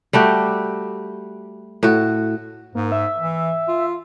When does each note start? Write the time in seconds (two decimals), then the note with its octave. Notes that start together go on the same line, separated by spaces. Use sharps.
0.13 G3 A3 F#4 G4
1.83 A2 F#4
2.75 G#2 A#3
2.92 E5
3.19 E3
3.68 F4